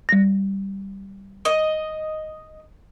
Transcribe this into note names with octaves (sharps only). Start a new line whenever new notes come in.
G3 A#6
D#5